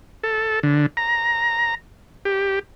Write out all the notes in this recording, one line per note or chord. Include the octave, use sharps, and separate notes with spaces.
A4
D3
A#5
G4